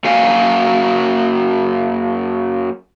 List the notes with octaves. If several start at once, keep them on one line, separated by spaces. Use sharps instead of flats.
F#2 F#3 A#3 F5 G#5